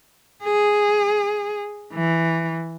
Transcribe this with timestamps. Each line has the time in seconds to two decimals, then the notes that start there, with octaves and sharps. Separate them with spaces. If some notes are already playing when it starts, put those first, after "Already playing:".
0.44 G#4
1.93 E3